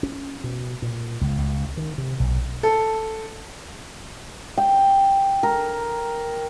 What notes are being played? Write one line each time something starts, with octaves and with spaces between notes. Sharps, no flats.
C#4
B2
A#2
C#2
C#2
D#3
C3
B1
A4
G5
A#4